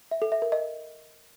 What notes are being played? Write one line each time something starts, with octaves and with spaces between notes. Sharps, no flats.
E5
A4
E5
A#4
D#5